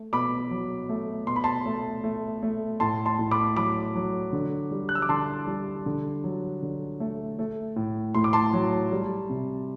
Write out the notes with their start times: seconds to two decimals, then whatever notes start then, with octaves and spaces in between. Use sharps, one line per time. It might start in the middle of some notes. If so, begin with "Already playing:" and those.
Already playing: A3
0.13 B2 B5 D6
0.51 F#3
0.89 A3
1.27 B2 C6
1.36 B5
1.44 A5 C6
1.66 A3
2.04 A3
2.43 A3
2.80 A2 A5 C6
3.06 A5 C6
3.19 A2
3.31 B5 D6
3.56 F#3 B5 D6
3.95 F#3
4.33 D3
4.71 G3
4.89 F#6
4.95 E6
5.02 D6
5.09 D3 A5 C6
5.47 G3
5.86 D3
6.24 F#3
6.62 D3
7.00 A3
7.39 A3
7.76 A2
8.15 A2 C6
8.24 D6
8.33 A5 C6
8.53 F#3
8.92 G3
9.30 C3